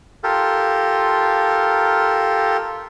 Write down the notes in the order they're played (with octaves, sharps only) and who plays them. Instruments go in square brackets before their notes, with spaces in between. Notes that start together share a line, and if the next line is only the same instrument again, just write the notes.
[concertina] F4 G4 A4 A#4